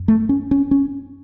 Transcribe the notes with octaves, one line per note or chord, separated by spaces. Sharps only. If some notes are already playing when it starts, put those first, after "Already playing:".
Already playing: F#2
A3
C#4
C#4
C#4